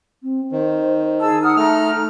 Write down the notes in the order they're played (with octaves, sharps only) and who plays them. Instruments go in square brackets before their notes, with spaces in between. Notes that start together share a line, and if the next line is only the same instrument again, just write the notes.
[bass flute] C4
[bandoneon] D#3 [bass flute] C5
[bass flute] D#4 [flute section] G#4 A5 E6
[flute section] F#5 D#6 F6
[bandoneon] A3 F6 [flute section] A#5